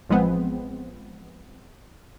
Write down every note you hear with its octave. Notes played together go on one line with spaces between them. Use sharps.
A1 F3 G#3 B3 C4